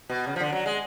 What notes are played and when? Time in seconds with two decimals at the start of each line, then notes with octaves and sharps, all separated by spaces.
0.09 B2
0.27 C#3
0.36 F3
0.40 D3
0.52 F#3
0.66 G#3